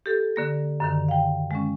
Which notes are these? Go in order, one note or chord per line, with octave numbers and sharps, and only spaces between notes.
G4 A4
D3 A#3 A#6
F#2 D3 D#3
F5 G5
G#3 C#4